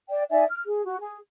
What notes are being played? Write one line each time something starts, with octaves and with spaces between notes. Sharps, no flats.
D5 G5
D#4 D5 E5 G#5
F6
G#4
F#4
G#4